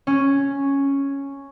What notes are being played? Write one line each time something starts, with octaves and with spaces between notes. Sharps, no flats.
C#4